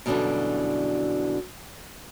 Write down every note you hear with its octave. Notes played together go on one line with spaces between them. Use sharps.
F#2 B2 D3 E3 G3 D4